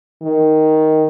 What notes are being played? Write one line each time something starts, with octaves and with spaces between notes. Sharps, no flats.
D#3